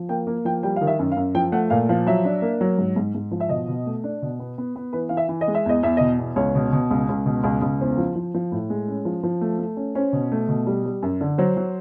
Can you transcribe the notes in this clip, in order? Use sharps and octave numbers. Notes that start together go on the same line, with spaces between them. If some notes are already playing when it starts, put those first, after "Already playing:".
Already playing: F3
A#3 G5
A#3
F3 G5
G3 G5
D#3 F5
E5
F#2
F5
F#2
F3 G5
A3 F#5
A#2 F5
F3 F5
F#3 E5
D4
A#3
F#3
G#2
G#2
G#2
F3
E5
B2 D#5
B2
A3
D4
B2
B3
B3
B3
E3 B4
E3 F5
E5
E3
D#5
G#3
E5
E2 D#5
E2 E5
B2 D#5
E2
C#2 C#5
B2
B2
C#2
C#2
B2
C#2
C#2
E2 C5
F3
F3
F3
A2
G#3
C#4
F3
F3
A3
A3
C#4
C#4 C5
B2
A3
B2
G3
G3
F#2
D3
F#3 C5
F#3